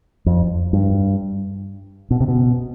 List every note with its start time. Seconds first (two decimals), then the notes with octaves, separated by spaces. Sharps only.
0.26 F2
0.73 G2
2.11 B2
2.20 C3
2.28 B2